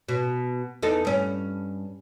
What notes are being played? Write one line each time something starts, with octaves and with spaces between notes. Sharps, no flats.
B2
E2 D#4 A4
G2 C#4